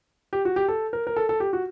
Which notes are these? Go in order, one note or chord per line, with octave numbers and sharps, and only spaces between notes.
G4
F#4
G4
A4
A#4
A#4
A4
A4
G4
F#4